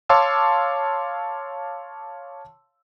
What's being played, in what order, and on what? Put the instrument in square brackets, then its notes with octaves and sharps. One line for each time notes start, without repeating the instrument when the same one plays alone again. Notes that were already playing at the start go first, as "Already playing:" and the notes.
[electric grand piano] C#5 F5 A5 C6 D6 E6